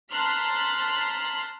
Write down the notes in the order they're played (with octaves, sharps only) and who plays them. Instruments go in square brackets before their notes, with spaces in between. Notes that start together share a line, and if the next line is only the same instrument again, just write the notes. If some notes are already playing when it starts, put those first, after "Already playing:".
[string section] A5 A#5 C6 F6 F#6 B6